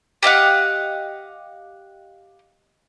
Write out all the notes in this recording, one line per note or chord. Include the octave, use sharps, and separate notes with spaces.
G4 D#5 F5 F#5